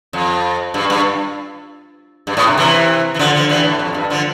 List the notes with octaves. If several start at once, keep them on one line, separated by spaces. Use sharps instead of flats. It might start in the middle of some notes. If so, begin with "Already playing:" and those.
F2
G2
G2
G2
A2
C3
C3 E3
E3
D3 F3
D3 F3
E3 G3
A2
F2
G2
D3 F3